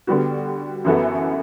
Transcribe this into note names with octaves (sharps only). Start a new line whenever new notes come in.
D3 G3 B3 F#4
F#2 E3 B3 F#4 A4